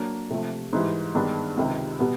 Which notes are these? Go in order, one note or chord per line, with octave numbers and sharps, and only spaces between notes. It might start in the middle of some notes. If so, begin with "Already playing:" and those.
Already playing: F#3 A#3 D4
C3 F3 A3
G#2 E3 G3
G2 D#3 G#3 B3 D4
C#2 C3 D#3
B2 G3 B3